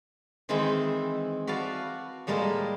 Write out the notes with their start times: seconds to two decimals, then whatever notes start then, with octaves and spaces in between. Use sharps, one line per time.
0.49 D#3 E3 G#3 C4 E4 B5
1.47 F#4 B4 D5 F5 A5
2.27 A2 G3 G#3 A#3 A#4 A5